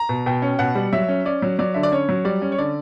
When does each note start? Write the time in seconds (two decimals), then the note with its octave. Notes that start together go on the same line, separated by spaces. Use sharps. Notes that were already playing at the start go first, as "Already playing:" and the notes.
Already playing: A#5
0.09 B2
0.26 B2 G5
0.42 C#4
0.59 B2 F#5
0.75 G3
0.93 F#3 E5
1.09 C#4
1.25 C#4 D5
1.42 F#3
1.59 F#3 D5
1.74 D3 E5
1.83 D5
1.92 C#4 C#5
2.09 F#3
2.25 G3 D5
2.42 C#4
2.52 C#5
2.58 D3 D5